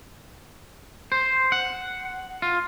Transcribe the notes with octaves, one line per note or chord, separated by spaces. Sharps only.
C5
F#5
F4